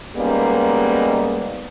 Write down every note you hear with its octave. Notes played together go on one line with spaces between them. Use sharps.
G3 G#3 A#3 B3 C#4 D#4